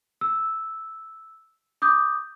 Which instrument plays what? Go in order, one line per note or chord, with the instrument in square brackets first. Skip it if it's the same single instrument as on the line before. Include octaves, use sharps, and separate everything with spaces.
[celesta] E6
D6 D#6 G6